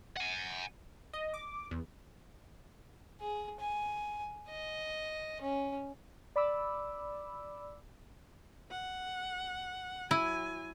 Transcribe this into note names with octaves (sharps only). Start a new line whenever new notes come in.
F#5 G#5
D#5
D6
E2
G#4
G#5
D#5
C#4
D5 B5 D6 E6
F#5
F#3 E4 G#5